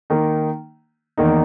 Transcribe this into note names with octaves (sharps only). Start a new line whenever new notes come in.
D#3 A#3 D#4
E2 D#3 A#3 D#4